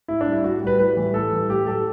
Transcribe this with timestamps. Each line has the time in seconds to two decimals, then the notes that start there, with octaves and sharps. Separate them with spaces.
0.08 A2 E4
0.21 D4
0.27 G3
0.32 E4
0.44 A2 F#4
0.61 G3
0.67 B4
0.79 A2 B4
0.97 E3 G3
1.14 A2 A4
1.32 E3 G3
1.49 A2 G4
1.66 F#3 A4